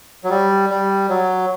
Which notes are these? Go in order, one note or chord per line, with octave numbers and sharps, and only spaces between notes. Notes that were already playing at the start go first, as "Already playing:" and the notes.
F#3
G3
G3
F#3